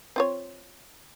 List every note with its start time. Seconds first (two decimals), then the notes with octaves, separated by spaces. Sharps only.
0.16 C4 F4 C#5